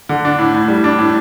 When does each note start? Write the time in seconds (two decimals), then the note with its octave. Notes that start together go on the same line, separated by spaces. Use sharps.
0.09 D3
0.25 D4
0.39 A2
0.54 A2
0.68 G3
0.84 D4
0.99 A2